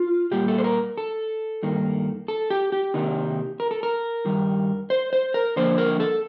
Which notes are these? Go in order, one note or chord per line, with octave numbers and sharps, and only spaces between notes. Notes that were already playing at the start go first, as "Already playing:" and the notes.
Already playing: F4
A#2 G3 A#3 G4
A4
C5
A#4
A4
G2 D#3 A#3
A4
G4
G4
C3 D#3 A#3 D#4
A#4
A4
A#4
G2 D#3 G3
C5
C5
A#4
D3 F3 A#3 C5
A#4
A4